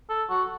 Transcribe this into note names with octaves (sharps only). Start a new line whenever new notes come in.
A4
F#4